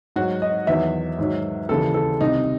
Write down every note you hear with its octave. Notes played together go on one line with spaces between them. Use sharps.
G#2 F#3 F#4
D#5
E2 D#3 F#3 E5
G#2 D#3 F#3
D#2 C#3 E3 A4
A4
C2 C3 D#3 D#4